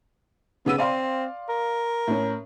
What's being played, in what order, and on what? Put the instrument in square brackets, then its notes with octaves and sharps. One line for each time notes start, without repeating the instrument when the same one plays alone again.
[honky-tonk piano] C#3 E6 D#7 [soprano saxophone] B3
[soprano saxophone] C4 [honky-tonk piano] D5 F5 C6
[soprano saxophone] A#4
[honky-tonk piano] A2 C#4